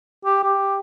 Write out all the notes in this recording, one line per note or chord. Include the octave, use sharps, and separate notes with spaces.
G4
G4